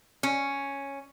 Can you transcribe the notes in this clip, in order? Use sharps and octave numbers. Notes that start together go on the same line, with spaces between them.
C#4